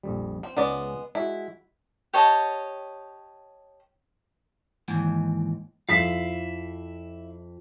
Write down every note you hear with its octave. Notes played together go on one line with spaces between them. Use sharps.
A#1 F2 G3
C4
C#2 G#3 B3 C#4 D5
G#3 E4 F#4
G4 C#5 D#5 A5
D#2 G#2 E3
F2 E4 F5 B6